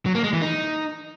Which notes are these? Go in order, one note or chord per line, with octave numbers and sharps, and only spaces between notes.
F#3
A#3
G#3
E3
D#4